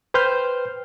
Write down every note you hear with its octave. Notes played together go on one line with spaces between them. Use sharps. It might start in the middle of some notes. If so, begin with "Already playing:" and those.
B4 C5 G5 F6 G6